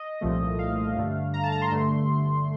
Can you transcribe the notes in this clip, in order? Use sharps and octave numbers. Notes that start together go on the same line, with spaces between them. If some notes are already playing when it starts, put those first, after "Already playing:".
Already playing: D#5
C2 A#2 F3 A3
F5
G2 D3 A3
A#5
A5
A#5
C6
G2 D3 A3